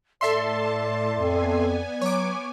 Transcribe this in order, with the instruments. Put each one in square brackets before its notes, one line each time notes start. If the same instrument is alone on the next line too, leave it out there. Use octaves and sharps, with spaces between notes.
[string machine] A2 A5 [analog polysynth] A4 E5 C6 [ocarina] D5
[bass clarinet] F2 [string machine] B3 G#5
[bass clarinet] F#3 [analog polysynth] C#5 D6